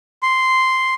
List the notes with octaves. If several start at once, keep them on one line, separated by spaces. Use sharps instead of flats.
C6